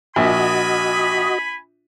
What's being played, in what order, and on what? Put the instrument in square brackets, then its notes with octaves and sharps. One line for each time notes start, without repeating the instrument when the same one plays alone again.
[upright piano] A#1 [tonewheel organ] F#4 D#5 [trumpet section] G#5 B5